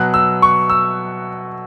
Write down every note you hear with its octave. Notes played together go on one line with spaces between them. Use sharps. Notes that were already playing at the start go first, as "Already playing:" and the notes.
Already playing: B2 F#3 F#6
E6
C#6
E6